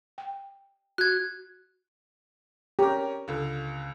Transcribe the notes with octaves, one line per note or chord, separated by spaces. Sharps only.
G5
F#4 F#6 G#6
C#4 G4 A#4
C#2 D3